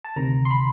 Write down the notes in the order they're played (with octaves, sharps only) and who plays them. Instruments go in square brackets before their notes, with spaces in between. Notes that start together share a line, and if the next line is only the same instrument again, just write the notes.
[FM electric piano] A5
D2 C3 D#3 A#5
C6
B5